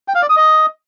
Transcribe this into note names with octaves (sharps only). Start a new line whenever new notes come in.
G5
F5
D5
D#6
D#5